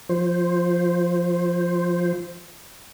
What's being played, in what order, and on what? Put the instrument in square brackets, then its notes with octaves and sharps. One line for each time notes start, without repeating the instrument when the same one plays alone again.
[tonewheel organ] F3 C5